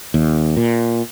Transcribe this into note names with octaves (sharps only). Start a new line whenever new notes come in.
D#2
A#2